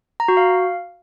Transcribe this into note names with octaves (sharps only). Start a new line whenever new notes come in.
A#5
F#4
F5